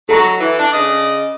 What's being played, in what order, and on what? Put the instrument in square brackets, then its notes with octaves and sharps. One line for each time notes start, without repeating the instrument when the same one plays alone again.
[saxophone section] F#3 [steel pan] A4 A#5 C#6
[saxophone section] E3
D4
C#3 D5 D#5